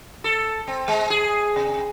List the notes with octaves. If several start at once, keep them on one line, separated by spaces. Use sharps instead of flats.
A4
C4
G#3
G#4
C3